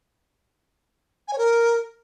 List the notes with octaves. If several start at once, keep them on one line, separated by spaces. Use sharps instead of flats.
G#5
C#5
A#4